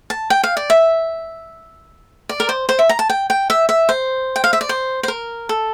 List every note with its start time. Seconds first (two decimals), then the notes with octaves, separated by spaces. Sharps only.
0.10 A5
0.30 G5
0.43 F5
0.57 D5
0.70 E5
2.29 D5
2.40 A#4
2.49 C5
2.69 C5
2.79 E5
2.89 A#5
2.99 A5
3.10 G5
3.30 G5
3.50 E5
3.69 E5
3.89 C5
4.36 G5
4.44 F5
4.53 E5
4.61 D5
4.69 C5
5.03 C5
5.08 A#4
5.49 A4